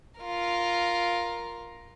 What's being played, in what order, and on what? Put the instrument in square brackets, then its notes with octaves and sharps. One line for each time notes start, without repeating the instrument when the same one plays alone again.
[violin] F4 A#4